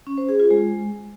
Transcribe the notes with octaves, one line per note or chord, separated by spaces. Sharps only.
C#4
C5
G#4
F4
G#3